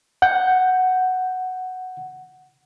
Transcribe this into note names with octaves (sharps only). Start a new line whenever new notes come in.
F#5 G6